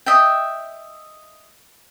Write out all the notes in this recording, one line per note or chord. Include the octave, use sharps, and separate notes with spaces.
D#5 E5 G5